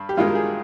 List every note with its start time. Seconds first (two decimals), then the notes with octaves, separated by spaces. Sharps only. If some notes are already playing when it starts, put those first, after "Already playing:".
Already playing: G2
0.09 G4
0.17 G2 D#3 G#3 F4
0.27 A#4
0.35 G#4